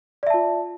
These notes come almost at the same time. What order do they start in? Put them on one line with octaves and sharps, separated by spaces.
D5 E5 A5 F4